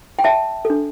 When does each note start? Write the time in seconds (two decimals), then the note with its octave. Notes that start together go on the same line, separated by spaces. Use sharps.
0.19 G5
0.24 E5 A5
0.65 A4
0.70 D4